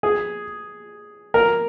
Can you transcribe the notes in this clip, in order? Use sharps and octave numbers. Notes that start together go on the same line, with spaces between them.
G#4
A#4